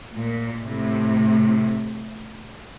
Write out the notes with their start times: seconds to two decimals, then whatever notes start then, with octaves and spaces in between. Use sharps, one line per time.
0.15 A#2
0.64 A2 C3